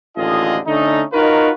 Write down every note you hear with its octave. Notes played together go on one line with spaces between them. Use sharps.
A1 D#2 D3 F4 G#4 D#5
D3 A3 C#4 D#4
D#4 F4 F#4 A#4 B4 C#5